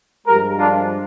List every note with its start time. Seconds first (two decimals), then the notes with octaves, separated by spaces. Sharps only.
0.27 G2 F3 G#3 G4 A#4
0.58 D4 F4